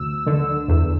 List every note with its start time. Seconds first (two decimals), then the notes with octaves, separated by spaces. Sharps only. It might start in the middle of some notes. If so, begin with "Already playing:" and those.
Already playing: D2 E6
0.26 D3
0.68 E2